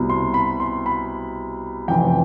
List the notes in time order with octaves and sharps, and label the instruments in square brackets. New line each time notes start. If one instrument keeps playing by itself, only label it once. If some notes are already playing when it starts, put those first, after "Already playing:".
Already playing: [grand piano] C2 B2
C6
B5
C6
B5
F1 F2 E3 G5